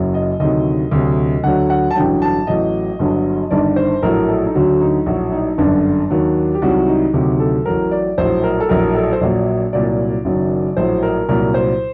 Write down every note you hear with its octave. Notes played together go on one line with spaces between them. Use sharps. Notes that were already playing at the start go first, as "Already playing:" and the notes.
Already playing: F#1 F#2 F#3
D#5
D2 C3 D#3 F#3 D#5
D2 C3 F#3
D2 D3 F#3 F#5
F#5
A5
A1 G2 D3 F#3 G5
A5
A1 A2 F#3 D#5
G1 G2 D3 F#3
G1 G2 D#3 D5
C5
A#1 A2 F#3 A#4
A4
D#4
D2 D3 F#3 F#4
D#4
A#1 A2 F#3 F#4
D#4
G1 F#2 D3 D4
D#2 D#3 F#3
G4
C2 C3 D#3 F#3 F#4
D#4
D2 C3 D#3 F#3 G4
A4
A1 A2 F#3 A#4
D5
A#1 A2 F#3 C5
A#4
A4
A#1 A2 F#3 A#4
A4
C5
A#1 A#2 F#3 D5
C2 A#2 F#3 D5
F#1 F#2 D#3 F#3
A#1 A2 F#3 C5
A#4
C2 A#2 F#3 A#4
C5